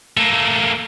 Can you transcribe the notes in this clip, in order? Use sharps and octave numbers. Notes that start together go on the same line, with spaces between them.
A3 A#3